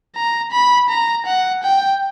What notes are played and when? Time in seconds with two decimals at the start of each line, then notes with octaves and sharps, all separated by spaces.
0.15 A#5
0.52 B5
0.89 A#5
1.26 F#5
1.63 G5